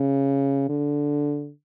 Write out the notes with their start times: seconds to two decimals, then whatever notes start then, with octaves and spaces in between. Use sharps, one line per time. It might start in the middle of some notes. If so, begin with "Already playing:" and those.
Already playing: C#3
0.69 D3